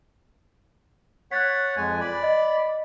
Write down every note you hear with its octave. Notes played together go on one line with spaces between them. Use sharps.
C#5 F#5 F#6 A6 B6
F2 G#3 G#5
D5 B5
D#5